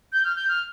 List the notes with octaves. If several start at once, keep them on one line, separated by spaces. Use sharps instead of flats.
G6
F6
G6
F6